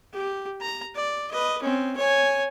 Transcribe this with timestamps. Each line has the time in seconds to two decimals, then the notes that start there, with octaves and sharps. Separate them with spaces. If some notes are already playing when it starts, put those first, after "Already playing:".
0.14 G4
0.61 A#5
0.96 D5
1.32 B4 D#5
1.63 C4 C#4
1.97 C#5 G#5